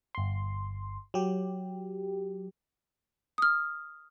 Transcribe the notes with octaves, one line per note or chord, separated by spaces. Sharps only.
G1 C6
F#3 G4
D#6 F6